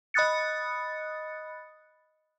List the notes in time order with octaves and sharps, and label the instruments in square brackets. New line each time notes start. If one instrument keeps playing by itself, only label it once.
[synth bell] D#5 B5 D#6 F#6 A6 C#7